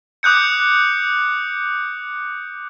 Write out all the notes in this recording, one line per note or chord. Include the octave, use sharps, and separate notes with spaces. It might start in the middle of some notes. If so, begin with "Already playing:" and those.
D6 D#6 F#6 G6 C#7